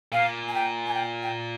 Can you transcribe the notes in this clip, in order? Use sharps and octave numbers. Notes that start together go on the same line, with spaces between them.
A#2 F5
G#5
G5
G#5
G5
G5